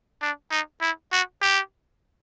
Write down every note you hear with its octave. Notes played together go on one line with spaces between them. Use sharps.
D4
D#4
E4
F#4
G4